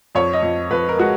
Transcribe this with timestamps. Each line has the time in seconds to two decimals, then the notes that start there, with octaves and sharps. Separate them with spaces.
0.15 F2 C#5
0.33 D#5
0.42 F2
0.70 F2 B4
0.89 A#4
0.98 G#3 F#4